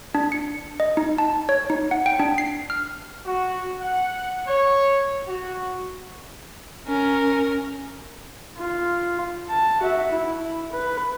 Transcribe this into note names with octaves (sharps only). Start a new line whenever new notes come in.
D4
C#7
D#5
D#4
A5
C#5
D#4
F#5
G5
D4
C7
F6
F#4
F#5
C#5
F#4
C#4 A#4
F4
A5
F#4 E5
E4
B4